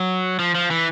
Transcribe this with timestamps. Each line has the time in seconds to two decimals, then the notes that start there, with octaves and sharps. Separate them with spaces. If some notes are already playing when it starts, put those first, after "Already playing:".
Already playing: F#3
0.39 F3
0.55 F3
0.71 E3